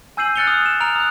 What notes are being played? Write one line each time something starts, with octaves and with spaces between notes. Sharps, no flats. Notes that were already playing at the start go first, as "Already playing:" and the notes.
G#5 E6 G6 C7 D#7 F#7
F6 F#6 A6 C#7 F7 G7
D#6
E7
A#5 F6 D7 F7
D#6 F#6